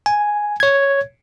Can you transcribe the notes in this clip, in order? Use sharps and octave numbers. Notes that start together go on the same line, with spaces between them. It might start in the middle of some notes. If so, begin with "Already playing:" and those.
G#5
C#5 G#6